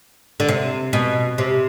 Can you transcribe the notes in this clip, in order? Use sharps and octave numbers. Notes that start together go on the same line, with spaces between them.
D3
C3
B2
C3